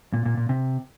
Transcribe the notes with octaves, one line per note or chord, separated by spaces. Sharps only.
A#2
A#2
A#2
C3